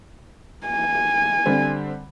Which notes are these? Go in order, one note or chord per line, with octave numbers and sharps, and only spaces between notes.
G#5
D3 G3 C4